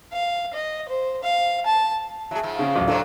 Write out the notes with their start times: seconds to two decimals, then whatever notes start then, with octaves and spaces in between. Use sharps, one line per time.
0.12 F5
0.53 D#5
0.89 C5
1.23 F5
1.66 A5
2.31 F#3 G#4 E5 A5
2.43 G#2 F3
2.59 C#3
2.76 D1 A1 F#3
2.88 C3 F3 F#3 D4 A4 C5